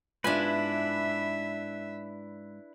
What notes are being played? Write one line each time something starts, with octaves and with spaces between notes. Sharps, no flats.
G#2 B3 D4 E4 F4 B4 E5 G#5